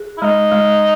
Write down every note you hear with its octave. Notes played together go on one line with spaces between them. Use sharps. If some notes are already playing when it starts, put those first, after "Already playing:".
Already playing: G#4
E4
G#3 D#4
G#3